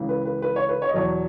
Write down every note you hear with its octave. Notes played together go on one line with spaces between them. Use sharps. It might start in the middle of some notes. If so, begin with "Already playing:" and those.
Already playing: C#2 C#3 E3
B4
B4
B4
C#5
B4
C#5
D#5
E2 B2 F#3 C#5